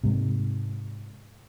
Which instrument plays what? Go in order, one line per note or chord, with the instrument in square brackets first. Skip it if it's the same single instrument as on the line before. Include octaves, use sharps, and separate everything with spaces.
[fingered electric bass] G#2 C3